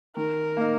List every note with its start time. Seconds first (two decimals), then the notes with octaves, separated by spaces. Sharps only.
0.16 D#3 A#4
0.57 A#3 D#4